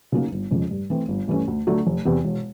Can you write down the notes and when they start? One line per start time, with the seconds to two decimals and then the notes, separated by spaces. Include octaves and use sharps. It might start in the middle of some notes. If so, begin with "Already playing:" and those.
0.12 C#3 F#3 A#3 D#4
0.32 G1
0.51 F2 C#3 F3 G#3
0.71 G2
0.90 E3 A3 C4
1.08 G1
1.28 G2 E3 A3 C#4
1.48 D2
1.67 D3 F#3 A3
1.87 F1
2.05 E2 C3 E3
2.25 E1